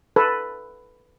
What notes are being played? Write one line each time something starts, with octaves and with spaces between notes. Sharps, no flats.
A4 B4